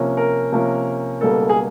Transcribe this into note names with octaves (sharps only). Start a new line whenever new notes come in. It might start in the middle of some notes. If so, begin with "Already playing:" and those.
Already playing: C3 F3 A#3 C#4
A#4
C3 F3 A#3 C#4
C#2 B2 G3 A#3 A4
G#4